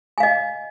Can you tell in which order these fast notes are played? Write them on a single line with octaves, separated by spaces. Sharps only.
G#5 F5 D#5